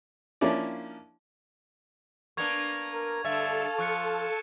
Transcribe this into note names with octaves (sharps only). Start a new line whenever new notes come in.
F3 A#3 C#4 D4 E4 D5
A#3 B3 D4 C#6 G#6 F7
A#4
G2 D3 A4 E5 F5 A5 A6
F3 C#6 F#6 C#7